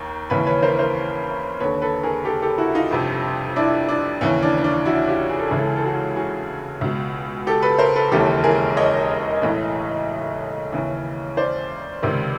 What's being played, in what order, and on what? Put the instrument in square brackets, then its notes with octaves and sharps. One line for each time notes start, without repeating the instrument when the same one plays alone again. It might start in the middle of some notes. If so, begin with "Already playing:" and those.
Already playing: [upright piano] D#2 D#3 A#4
D#2 C#3 E3 B4 C#5
B4 C#5
A#4 C5
A#4 C5
D#2 D3 B4 C#5
A4 B4
G#4 A#4
G4 A4
G4 A4
E4 F#4
D#4 F4
G1 F2 C3
D4 E4
D4
D#2 C#3 E3 C#4
D4
C#4
D4
E4 F#4
F4 G4
G#4
A4
C#2 C#3 E3 G#4
A4
G#4
A4
F#4 G#4
F#4 G#4
C#2 B2
G4 A4
A4 B4
A#4 C5
A4 B4
E1 D#2 C#3 E3 G4 A4
G#4 A#4
C#5 D#5
B1 A2 E3
D#2 C#3 E3
C5 D5
C#2 C3 D#3